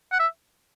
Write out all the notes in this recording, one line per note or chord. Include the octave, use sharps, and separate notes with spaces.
F#5
E5